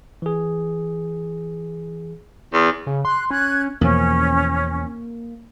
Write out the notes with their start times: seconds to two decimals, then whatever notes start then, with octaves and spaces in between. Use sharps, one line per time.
0.22 E3 G#4
2.54 E2
2.87 C#3
3.05 C6 F#6
3.31 C#4 F#6 G#6
3.81 E2 B2 F3 A#3 C#4